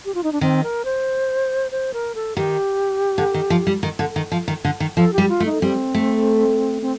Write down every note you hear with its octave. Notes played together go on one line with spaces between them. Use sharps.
G4
F4
D#4
D4
D#3 C4
A#4
C5
C5
A#4
A4
D#3 G4
D3
D#3
F3
G3
D#3
D3
D#3
F3
D#3
D3
D#3
F3 A4
G3 G4
F4
A3
D#4
G3 C4
A3
C4